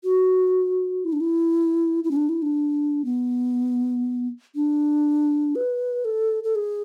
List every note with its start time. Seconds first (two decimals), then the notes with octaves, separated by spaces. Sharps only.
0.04 F#4
1.05 E4
1.13 D4
1.20 E4
2.04 E4
2.11 C#4
2.16 D4
2.29 E4
2.42 D4
3.05 B3
4.56 D4
5.55 B4
6.05 A4
6.44 A4
6.55 G#4